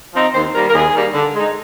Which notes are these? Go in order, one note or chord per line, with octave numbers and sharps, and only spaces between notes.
F3 C4 D#4
D#2 C5
D#3 G3 A#3 A#4
A#4
D#2 G#4
D#3 G3 A#3
D3
G#3 D#4